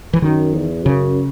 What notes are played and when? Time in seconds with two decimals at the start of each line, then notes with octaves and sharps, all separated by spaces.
0.13 E3
0.22 F#2 D#3
0.54 E2
0.85 F#2 C#3